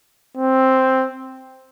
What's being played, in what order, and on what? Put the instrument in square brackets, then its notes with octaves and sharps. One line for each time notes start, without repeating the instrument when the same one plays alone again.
[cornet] C4